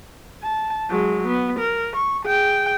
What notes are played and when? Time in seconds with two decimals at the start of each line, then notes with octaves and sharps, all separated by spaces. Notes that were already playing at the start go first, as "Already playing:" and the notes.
0.42 A5
0.89 F#3 G#3
1.28 B3
1.60 A#4
1.96 C#6
2.26 G#4 G5